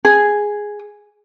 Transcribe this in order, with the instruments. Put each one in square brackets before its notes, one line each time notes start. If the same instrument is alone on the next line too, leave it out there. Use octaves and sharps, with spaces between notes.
[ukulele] G#4